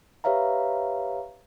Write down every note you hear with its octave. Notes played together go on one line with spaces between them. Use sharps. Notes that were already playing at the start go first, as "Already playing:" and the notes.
G4 B4 C#5 E5 F5 A#5